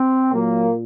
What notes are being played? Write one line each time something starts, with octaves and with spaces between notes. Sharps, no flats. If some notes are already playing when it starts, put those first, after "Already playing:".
Already playing: C4
A#2 F#3 A#3